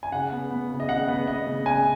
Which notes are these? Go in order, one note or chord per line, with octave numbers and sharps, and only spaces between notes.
G#5
C#3 F#5
B3
B3
C#3
D#5
C#3 F#5
B3
B3 D#5
C#3
C#3 G#5